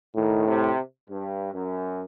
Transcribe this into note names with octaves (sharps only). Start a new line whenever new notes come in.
A2 D#3
C3
G2
F#2